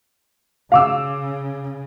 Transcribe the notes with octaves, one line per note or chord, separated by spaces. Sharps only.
C#3 F5 D6 E6